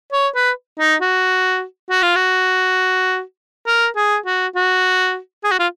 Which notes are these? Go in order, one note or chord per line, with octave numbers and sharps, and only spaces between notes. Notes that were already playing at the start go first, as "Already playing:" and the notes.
C#5
B4
D#4
F#4
F#4
F4
F#4
A#4
G#4
F#4
F#4
G#4
F#4
F4